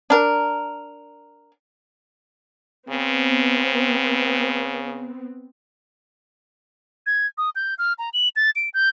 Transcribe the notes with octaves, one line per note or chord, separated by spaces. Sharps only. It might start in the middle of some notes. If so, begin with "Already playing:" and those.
D4 A#4
C#3 B3 C4
G#6
D#6
G6
F6
A#5
F#7
A6
D7
G6